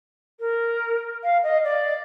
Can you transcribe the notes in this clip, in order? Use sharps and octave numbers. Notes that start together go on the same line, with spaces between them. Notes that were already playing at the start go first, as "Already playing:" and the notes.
A#4
F5
D#5
D5